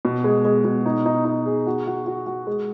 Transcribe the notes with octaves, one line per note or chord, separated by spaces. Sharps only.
B2
G#3
G#3
B2
D#4
D#4
D#4
G#4
F#4
F#4
F#4
F#4
G#3